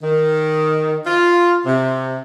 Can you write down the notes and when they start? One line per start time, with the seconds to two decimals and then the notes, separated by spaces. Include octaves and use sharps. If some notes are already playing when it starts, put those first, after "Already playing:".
0.02 D#3
1.06 F4
1.66 C3